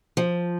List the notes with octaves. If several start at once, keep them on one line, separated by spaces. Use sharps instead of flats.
F3